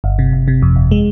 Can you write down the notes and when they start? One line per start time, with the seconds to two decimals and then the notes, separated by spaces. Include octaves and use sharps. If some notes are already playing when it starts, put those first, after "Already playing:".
0.04 G1
0.19 C3
0.33 G1
0.48 C3
0.62 F2
0.76 G1
0.91 G#3